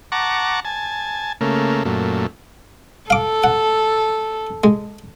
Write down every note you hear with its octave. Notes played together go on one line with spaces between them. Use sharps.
F#5 A5 A#5 C#6 D6
G#5 A5
C#3 A3 A#3
F#2 A#2 A3
A4 F5 D6
F#5
G#3